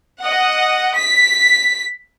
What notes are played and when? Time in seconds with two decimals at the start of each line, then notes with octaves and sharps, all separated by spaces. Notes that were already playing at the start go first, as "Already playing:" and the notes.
0.21 D#5 F#5
0.96 B6